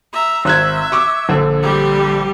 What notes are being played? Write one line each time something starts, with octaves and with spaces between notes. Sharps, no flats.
E5 A#5
G#1 E5 F#6 G#6
C#6 D6 E6
A#1 D3
G3 G4